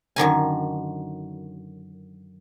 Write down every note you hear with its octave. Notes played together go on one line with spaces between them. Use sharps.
F#2 D3 D#3 G#5